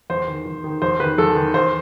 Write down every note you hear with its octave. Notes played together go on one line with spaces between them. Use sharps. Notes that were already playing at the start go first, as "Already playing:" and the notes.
E2 C5
D#3
E2
D#3
E2 C5
D#3 B4
E2 A4
D#3
E2 C5